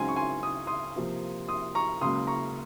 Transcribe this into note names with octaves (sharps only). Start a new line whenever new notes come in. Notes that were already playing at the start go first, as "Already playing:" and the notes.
Already playing: C#2 C#3 F#3 C4 D#4 G#5 C6
C#6
G#5 C6
D#6
C6 D#6
C3 F3 A#3
C6 D#6
A#5 C#6
C#2 C#3 F#3 A#3 C6 D#6
A#5 C#6